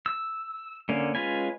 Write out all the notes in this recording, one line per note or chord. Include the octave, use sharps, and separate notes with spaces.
E6
D3 A#3 C#4
G#3 C#4 F4 B4 G#5